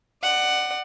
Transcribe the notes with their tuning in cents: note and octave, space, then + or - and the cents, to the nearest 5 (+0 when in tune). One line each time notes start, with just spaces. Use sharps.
D5 +35 F#5 +10